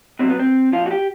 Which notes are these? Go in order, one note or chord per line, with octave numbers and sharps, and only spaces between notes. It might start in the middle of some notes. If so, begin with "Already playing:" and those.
B2 F#3 C4
B3
C4
A#2 F3 F4
F#4
G4